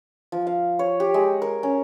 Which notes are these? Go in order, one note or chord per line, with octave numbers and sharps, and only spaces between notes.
F3
F5
C#5
G4
G#3
A#4
C#4